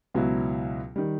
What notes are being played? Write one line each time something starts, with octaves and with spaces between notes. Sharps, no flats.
C#2 B2 F#3 B3 E4
D#3 G3